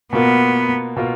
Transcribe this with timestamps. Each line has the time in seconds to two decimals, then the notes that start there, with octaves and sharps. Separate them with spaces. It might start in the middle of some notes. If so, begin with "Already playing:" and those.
0.13 B2 A#3 B3 F4 A#4
0.96 B2 A#3 F4 A#4